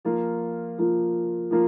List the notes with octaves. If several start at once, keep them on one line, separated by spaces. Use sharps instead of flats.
F3 A#3 F4
F3 A#3 F4
F3 A#3 F4